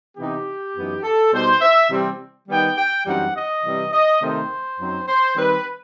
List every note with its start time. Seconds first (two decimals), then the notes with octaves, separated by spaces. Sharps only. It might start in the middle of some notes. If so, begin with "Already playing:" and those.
0.17 C3 E3 B3 D#4 G4
0.76 F#2 E3 B3 D#4
1.04 A4
1.32 B2 G3 D#4 C5
1.62 E5
1.90 C3 E3 G3 C4
2.49 D#3 G3 B3 D#4 G5
2.78 G5
3.06 F#2 E3 G3 C4 D#4 F#5
3.35 D#5
3.63 C3 E3 G3
3.93 D#5
4.21 C3 D#3 A3 C4 D#4 C5
4.79 F#2 F#3 C4 D#4
5.08 C5
5.37 D#3 G3 C4 B4